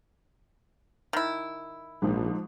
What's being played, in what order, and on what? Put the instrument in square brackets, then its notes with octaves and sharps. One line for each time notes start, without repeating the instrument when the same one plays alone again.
[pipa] D#3 E4
[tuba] A#1 [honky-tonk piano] G#2 F3